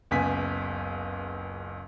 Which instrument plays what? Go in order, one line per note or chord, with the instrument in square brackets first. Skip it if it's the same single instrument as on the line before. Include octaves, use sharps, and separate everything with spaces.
[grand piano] F#1 C#2 B3 G#5 B6